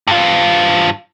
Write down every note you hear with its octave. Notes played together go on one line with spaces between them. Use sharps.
G2 F4